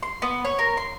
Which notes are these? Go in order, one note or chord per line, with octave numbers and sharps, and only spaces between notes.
C6
B3
C#5
A#4
C6